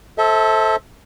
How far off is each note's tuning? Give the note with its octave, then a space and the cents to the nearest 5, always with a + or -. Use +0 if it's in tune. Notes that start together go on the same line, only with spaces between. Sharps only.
A4 +0 C5 +20 E5 -30